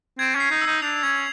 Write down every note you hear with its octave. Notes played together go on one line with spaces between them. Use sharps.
C4 G#6
C#4
C7
D#4
E6
D#4
D4 F7
C#4 G#6